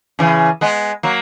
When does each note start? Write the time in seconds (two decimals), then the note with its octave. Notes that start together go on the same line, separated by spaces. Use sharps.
0.19 C#3 E3
0.61 G#3 B3
1.03 F#3 A#3